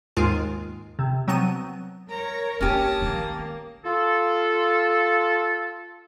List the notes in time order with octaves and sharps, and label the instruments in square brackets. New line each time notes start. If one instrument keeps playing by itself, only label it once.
[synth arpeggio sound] D#2 G#2 G#3 F4 A#4 G#5
C3
F#3 B3 C4 A5 D#7
[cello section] A#4 C#5 [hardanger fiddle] A#5
[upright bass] A#3 D4 [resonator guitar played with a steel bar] C#4 G4 [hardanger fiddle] A5 D#6
[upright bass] D#3 [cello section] A#3
[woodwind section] F4 A4